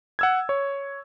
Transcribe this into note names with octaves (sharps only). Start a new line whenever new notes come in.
F#5 E6 G#6
C#5